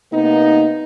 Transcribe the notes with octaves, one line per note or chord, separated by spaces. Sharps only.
C3 A#3 B3 D#4